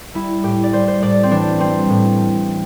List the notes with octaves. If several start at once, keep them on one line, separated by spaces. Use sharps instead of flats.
G3 E4
A2 G4
D5
G3 C5
C5
A2 D5
C4
E3 D4
G3 C4
A2